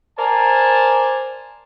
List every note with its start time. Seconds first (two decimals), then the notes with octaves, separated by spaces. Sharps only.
0.17 A#4 C5 D5 G#5 A5